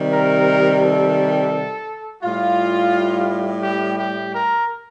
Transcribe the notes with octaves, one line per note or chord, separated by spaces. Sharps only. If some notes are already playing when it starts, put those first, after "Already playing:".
Already playing: C3 D#3 G3
A#4
A4
A2 G3 F4
G4
G4
A#4